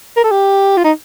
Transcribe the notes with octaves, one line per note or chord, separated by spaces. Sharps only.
A#4
A4
G4
F4
D#4